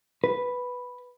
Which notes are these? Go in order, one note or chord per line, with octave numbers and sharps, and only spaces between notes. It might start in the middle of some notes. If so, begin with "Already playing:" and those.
B4